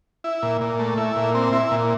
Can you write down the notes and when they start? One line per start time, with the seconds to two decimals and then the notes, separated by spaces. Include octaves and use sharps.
0.24 E4
0.42 A#2
0.61 A#2
0.79 A3
0.98 E4
1.16 A#2
1.35 C4
1.53 E4
1.71 A#2